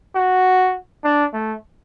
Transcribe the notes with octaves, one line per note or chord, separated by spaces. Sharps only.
F#4
D4
A3